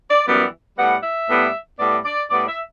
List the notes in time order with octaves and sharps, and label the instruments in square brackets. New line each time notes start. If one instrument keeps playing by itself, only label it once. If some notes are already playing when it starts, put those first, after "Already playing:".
[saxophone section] D5
F#2 E3 G3 B3 D5
A2 G3 B3 F#5
E5
A2 G3 B3
A2 G3 B3 D5
D5
A2 G3 B3 D5
E5